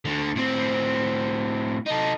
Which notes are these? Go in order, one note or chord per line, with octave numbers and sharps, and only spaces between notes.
D2 D3
A2 C4
D#4 A4